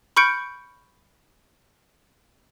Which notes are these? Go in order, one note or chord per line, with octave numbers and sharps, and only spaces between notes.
B5 C#6 F6 G6 C#7 D7